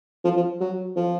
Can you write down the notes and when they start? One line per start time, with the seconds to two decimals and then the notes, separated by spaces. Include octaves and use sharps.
0.25 F3
0.37 F3
0.61 F#3
0.97 F3